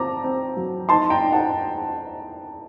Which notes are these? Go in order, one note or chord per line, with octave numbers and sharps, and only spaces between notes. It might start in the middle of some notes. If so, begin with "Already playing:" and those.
Already playing: C4 A5 A#5 D6
C4
F#3
D#4 A5 C6
G5 A#5
D#4
F#5 A5